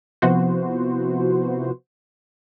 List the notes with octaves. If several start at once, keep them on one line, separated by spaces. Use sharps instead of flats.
C3 F3 B3 E4 F#4 C5